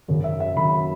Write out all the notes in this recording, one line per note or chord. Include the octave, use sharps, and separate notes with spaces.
G#1 F#2 C#3 F#3
E5
E5
G#1 F#2 C#3 F#3 B5